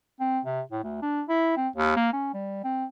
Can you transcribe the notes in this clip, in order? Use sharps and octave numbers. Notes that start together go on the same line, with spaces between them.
C4
C3
A2
D2
D4
E4
C4
D#2
A#3
C#4
G3
C4